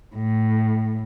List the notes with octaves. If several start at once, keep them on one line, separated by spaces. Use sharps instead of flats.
A2